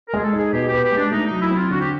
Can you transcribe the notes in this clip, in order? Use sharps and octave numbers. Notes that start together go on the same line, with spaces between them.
A#4
G#3 G#4
A4
D#4 G#4
B2 G4
B3 G4
G4
G#3
D4
A3 D#4
F#3 D#4
E4
C4
F4
D3 F#4
G4